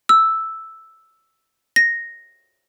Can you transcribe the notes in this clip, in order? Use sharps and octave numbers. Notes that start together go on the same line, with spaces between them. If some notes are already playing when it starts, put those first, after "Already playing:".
E6
A#6